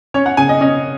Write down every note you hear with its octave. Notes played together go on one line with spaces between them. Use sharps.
C#4 C#5
F#5
C#3 G#5
D#5
C#4 D#5